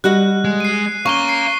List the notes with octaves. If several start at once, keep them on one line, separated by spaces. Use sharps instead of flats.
G3 F#4 D#5 F#6
G#3
C7 D#7
C#4 F5 A#5 C#6 D#7 G7
C7